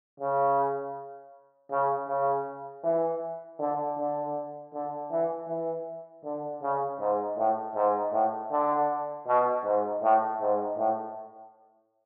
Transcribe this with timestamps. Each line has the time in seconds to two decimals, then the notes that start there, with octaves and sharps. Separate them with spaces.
0.20 C#3
1.71 C#3
2.08 C#3
2.83 E3
3.59 D3
3.98 D3
4.74 D3
5.11 E3
5.48 E3
6.24 D3
6.62 C#3
7.00 G#2
7.38 A2
7.75 G#2
8.13 A2
8.51 D3
9.27 B2
9.64 G#2
10.02 A2
10.40 G#2
10.77 A2